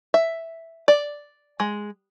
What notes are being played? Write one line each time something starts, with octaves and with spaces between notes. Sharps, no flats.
E5
D5
G#3